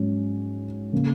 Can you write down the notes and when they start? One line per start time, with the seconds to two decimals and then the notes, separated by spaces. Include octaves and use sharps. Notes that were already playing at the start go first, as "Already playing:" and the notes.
Already playing: G#2 F#3 C#4
0.93 C#3 A#3